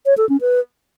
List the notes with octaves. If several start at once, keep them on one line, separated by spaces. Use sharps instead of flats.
C#5
A4
C#4
B4